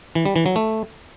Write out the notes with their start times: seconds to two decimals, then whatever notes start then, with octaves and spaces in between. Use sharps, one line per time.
0.15 E3
0.26 G3
0.36 E3
0.46 F#3
0.56 A3